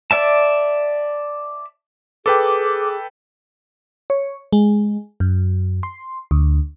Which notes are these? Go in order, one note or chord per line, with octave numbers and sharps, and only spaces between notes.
D5 E5 A5
G#4 A4 B4 G5 D6
C#5
G#3
F#2
C6
D2